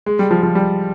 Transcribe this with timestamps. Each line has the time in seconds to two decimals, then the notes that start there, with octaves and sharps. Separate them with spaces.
0.06 G#3
0.19 G3
0.31 F3
0.43 F3
0.55 G3